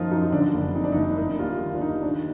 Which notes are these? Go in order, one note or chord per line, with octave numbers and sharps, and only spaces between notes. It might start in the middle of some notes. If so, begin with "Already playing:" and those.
Already playing: F#2 F3 A#3 D#4 F4
F#2 D#4
D3 D4
F#1
F2 D#4
D4
D#4
F#1
A#3 D#4
D#2 F4
D#3 F4
D4
D#2 D#4
D#3 D4